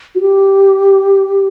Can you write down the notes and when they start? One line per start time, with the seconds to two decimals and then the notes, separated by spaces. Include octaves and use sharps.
0.15 F#4
0.21 G4